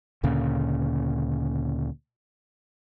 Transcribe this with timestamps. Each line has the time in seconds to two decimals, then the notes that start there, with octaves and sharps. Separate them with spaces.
0.23 D2 A#2 C#3